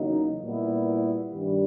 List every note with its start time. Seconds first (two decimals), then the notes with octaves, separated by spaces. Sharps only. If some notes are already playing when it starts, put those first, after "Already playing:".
Already playing: E2 C#3 F#3 A#3 D#4
0.43 A#2 G3 B3 E4
1.32 G2 D#3 G3